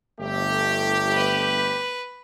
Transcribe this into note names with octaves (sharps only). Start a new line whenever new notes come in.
G1 A3 G4
B4